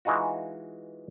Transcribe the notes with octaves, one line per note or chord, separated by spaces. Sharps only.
E3 G#3 D#4 F4 F#4